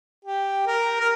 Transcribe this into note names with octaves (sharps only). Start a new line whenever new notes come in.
G4
A#4
A#4